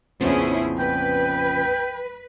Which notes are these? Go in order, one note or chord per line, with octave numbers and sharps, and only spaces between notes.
A#1 F2 C#3 F3 B3 C#4 E4 G#4
B4 G5